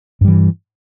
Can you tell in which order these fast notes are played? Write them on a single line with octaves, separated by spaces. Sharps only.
G2 G3 E3